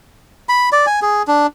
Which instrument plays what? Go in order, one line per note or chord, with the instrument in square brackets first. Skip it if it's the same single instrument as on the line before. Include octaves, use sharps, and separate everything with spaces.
[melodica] B5
D5
G#5
G#4
D4